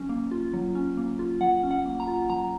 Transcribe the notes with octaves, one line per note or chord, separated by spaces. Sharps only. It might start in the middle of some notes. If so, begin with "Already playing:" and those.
Already playing: F#3 C#4
A#3
F4
F#3
C#4
A#3
F4
F#3 F#5
C#4
F#5
A#3
A#5
F4
F#3 A#5